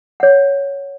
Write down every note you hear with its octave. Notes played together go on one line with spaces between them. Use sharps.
C#5 F#5